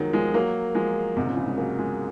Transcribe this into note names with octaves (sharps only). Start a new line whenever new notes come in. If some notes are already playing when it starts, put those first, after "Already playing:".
Already playing: D#3 F3 F#3 G#3
F3 G#3
F#3 A#3
F3 G#3
G#2 C3
A#2 C#3
C#3 F3
F3 G#3
F#3 A#3
F3 G#3